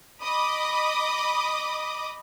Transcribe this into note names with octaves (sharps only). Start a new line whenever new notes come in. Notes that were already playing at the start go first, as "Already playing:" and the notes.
D#5 B5 D6 D#6